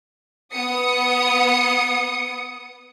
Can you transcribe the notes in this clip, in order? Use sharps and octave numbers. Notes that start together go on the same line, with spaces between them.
B3 D#6 C#7